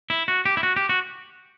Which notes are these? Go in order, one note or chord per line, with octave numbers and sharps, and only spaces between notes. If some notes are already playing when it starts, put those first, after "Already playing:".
E4
F#4
G4
E4
F#4
G4
F#4